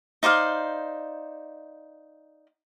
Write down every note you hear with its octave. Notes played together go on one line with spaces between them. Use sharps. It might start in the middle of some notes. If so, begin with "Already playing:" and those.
D#4 C5 D5 F5